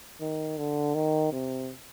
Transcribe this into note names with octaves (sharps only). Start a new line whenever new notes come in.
D#3
D3
D#3
C3